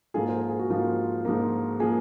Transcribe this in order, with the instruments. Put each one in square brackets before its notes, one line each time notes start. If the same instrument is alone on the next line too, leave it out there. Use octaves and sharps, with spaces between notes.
[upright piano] G#2 F3 A#3 F4 G#4
C5
A#4
G#4
F#4
G#2 F3 A#3 F4
G#2 F3 A#3
F3 A#3 F4 G#4